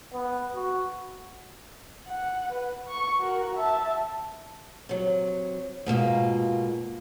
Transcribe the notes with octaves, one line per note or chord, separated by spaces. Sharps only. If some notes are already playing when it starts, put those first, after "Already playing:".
B3
F#4
F#5
B4
C#6
F#4 A#4
E5 A5
C3 F#3
G#2 B2 A#3 F4